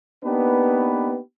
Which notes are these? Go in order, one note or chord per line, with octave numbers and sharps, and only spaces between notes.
A#3 B3 D4 D#4 G4 B4